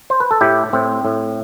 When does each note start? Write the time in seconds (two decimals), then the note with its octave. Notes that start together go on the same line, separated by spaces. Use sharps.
0.10 C5
0.20 B4
0.31 A4
0.41 A2 E4 G4
0.73 A2 C4
1.05 A2